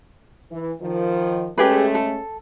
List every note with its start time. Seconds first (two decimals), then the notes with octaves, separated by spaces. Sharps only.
0.51 E3
0.81 D#3 F3
1.58 G#3 A3 C#4 G4 G#4 B4
1.95 A4